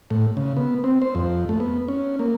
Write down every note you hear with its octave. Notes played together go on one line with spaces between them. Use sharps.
A2
C#3
B3
C4
C5
F2
A3
B3
C#4
A#3